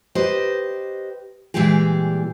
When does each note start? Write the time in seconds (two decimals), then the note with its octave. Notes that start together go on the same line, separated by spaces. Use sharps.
0.15 G4 B4 C5 D#5
1.54 A#2 E3 G3 G#3 G4 G#4